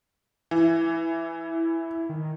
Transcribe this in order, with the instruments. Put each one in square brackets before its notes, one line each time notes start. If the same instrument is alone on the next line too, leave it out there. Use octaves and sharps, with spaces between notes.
[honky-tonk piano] E3 [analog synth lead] E4
[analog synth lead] D#3